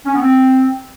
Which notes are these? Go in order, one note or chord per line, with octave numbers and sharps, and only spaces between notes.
C#4
B3
C4